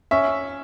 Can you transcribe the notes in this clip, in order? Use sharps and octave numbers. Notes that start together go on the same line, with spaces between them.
C#4 E5